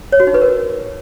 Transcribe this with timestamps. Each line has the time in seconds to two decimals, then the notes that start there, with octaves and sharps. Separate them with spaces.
0.12 C#5
0.20 F#4
0.27 D#4
0.34 B4
0.42 A#4